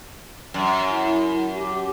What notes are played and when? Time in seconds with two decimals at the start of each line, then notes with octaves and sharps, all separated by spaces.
0.54 F#2
0.90 E4
1.55 G4